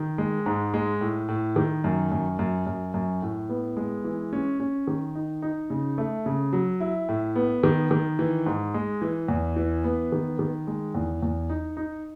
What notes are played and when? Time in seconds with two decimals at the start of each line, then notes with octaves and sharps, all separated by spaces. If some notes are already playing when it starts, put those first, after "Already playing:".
Already playing: D#3
0.18 G#3
0.46 G#2
0.74 G#3
1.01 A2
1.28 A2
1.56 D#3
1.84 F#2
2.12 F#2
2.39 F#2
2.66 F#2
2.94 F#2
3.22 A2
3.49 B3
3.77 G#3
4.04 E3
4.33 C#4
4.60 C#4
4.87 D#3
5.15 D#4
5.42 D#4
5.70 C#3
5.98 A3
6.26 C#3
6.53 F#3
6.80 E4
7.09 A2
7.36 B3
7.63 D#3
7.91 D#3
8.19 E3
8.46 G#2
8.74 G#3
9.02 E3
9.28 E2
9.56 E3
9.84 B3
10.12 D#3
10.39 D#3
10.67 G#3
10.95 E2
11.22 E2
11.50 D#4
11.77 D#4